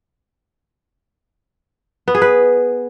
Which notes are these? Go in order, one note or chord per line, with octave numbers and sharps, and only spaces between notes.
B3
G#4
B4